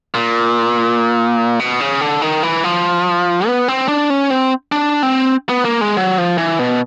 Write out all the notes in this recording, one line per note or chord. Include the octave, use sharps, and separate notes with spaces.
A#2
B2
C#3
D3
D#3
E3
F3
B3
C4
D4
C#4
C4
D4
C4
B3
A#3
G#3
F#3
F3
E3
B2